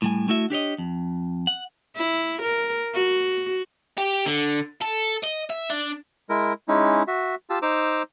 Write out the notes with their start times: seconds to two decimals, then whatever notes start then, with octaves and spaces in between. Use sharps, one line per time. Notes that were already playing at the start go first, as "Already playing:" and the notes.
0.02 A2 G3 G#5
0.28 A3 E4 F#4 E5
0.50 D4 G4 C#5 D#5
0.78 F2
1.47 F#5
1.96 E4
2.42 A#4
2.94 F#4
3.98 G4
4.26 D3
4.82 A4
5.23 D#5
5.50 E5
5.70 D4
6.30 G#3 E4 A#4
6.68 G#3 C#4 D#4 E4
7.07 F#4 E5
7.50 F4 G4 A5 E6
7.62 D#4 C5 A#5 D6 E6